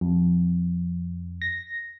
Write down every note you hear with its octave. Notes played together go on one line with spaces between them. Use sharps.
F2
A#6